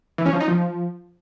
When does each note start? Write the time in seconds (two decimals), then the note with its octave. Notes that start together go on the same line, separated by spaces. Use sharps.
0.18 E3
0.26 C#4
0.33 F3
0.40 D#4
0.48 F3